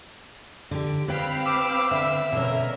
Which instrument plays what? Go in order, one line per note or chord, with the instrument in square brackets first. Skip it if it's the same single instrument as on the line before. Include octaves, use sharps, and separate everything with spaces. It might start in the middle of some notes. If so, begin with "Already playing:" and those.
[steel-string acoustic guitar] D3 G4
[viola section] C4 F5 B5 [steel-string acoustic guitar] B4 G5
[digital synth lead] D6 [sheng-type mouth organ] E6
[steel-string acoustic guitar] D3 [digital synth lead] E5
[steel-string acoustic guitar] B2 C#4 [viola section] D3 A#4